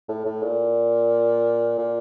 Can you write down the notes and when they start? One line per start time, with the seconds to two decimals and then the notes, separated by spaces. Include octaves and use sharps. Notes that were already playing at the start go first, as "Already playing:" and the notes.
0.08 A2
0.25 A2
0.43 A#2
1.78 A#2